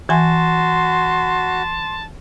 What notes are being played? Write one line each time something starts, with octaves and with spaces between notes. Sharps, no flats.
E3 F#4 G#5 A5 C6